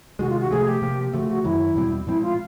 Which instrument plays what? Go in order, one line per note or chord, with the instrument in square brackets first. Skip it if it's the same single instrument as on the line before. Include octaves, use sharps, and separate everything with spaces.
[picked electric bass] C3 D#3 G#3 [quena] F#4
[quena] F4
F#4
[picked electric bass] C3 F3 A3 [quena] G#4
[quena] G4
[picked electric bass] C3 F3 A#3
[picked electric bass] C#3 F3 A3 [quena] F#4
[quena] F#4
[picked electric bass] F#2 D#3 F#3 [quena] E4
[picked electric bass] E2 B2 G3 C4
[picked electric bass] A#2 F3 G#3 C4 [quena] E4
[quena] F4